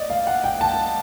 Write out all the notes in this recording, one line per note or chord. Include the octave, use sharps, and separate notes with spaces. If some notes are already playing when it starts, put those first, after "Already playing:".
Already playing: D5 D#5
F5
F#5
G5
A5